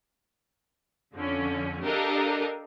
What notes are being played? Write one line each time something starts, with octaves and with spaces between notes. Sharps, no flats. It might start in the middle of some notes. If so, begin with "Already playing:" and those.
F2 D3 C#4
D4 G4 A4 A#4 D#5 F5